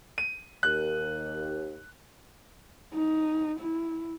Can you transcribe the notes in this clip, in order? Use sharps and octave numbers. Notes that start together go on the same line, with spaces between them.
D#7
D#2 F#6
D#4
E4